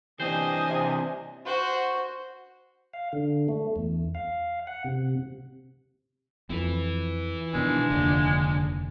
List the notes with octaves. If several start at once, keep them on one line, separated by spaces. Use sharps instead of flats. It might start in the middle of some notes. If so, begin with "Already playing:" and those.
E3 C4 D4 G4 C5 D#5 G#5
C3
F#4 C5
F5
D3
A3
E2
F5
F#5
C3
F2 E4 B4
B2 D#3 F3 G#3 D4
F1 D#2 D3